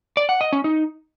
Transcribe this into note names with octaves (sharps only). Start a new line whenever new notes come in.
D5
F#5
D#5
C#4
D#4